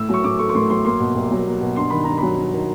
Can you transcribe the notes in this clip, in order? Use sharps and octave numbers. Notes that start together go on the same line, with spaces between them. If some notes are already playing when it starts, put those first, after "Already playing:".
Already playing: A2 E6
F#3 C#6
A2 D6
A3 C#6
C#6
A2 C6
F#3 C6
A#3 C6
B2
C2
F#3
A#3
B2
G2 C6
D#3 B5
G2 A#5
F#3 B5
G2
D#3